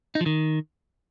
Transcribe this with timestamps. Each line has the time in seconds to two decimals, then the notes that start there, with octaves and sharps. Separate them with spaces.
0.15 D#4
0.21 F3
0.26 D#3